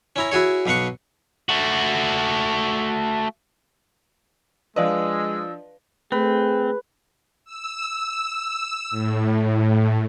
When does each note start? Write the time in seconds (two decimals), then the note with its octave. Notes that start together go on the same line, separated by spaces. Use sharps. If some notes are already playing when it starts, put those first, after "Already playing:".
0.16 C#4 E4 A#5
0.31 E4 F#4 G#4 C#5
0.66 B1 B2 F5 F#5 C#6
1.49 A3 F#4
4.76 F3 G#3 D4 B4 D5 D#5 F5 E6
6.12 A3 C4 G#4 B4
7.45 E6
8.91 A2